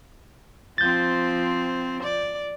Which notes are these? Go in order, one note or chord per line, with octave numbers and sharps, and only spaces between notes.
F3 C4 G6 A6
D5